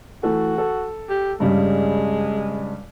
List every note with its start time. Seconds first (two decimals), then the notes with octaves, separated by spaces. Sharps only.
0.23 E3 A3 F#4 A4
0.58 A4
1.09 G4
1.40 G2 C#3 G3 G#3